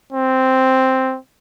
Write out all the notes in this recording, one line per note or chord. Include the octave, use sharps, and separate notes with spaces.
C4